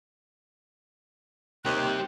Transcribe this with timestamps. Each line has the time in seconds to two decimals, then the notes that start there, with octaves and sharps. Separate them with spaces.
1.65 D#2 C3 G3 G4 C5 G5 F#6